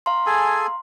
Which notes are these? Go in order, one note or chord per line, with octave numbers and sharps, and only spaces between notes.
F5 A#5 C6
G#4 A4 G#5